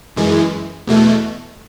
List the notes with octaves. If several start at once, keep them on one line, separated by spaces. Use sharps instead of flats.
F#2 E3 G#3
E2 B2 A3